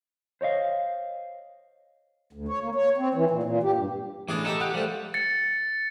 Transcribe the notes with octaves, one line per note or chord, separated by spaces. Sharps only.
C5 C#5 D#5 F5
D2
C#5
A#3
C#5
C4
E3
A#2
A#2
G4
G2
A2 E3 D4 G#4 D6
D#4 G4 A4 E5 B5
G4 F#5
F3 G3 A3
A6 C#7